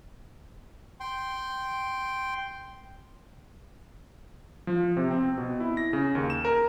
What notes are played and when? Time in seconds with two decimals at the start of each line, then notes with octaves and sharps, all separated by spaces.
1.00 G5 C6
4.67 F3
4.97 C3
5.11 C4
5.38 B2
5.60 E4
5.77 A#6
5.93 C#3
6.15 D#2
6.30 E7
6.45 A#4